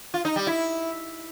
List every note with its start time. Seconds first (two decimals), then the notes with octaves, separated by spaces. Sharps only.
0.14 F4
0.25 D#4
0.36 G3
0.47 E4